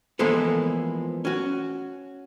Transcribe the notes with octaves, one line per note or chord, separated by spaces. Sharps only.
E3 F3 G#3 A#3 B3 A4
C#4 F#4